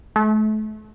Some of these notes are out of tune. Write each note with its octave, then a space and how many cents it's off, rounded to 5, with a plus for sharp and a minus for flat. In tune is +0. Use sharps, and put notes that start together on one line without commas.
A3 -35